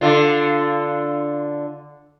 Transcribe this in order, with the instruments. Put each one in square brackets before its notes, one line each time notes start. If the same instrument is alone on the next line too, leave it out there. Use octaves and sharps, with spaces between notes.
[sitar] D3 F4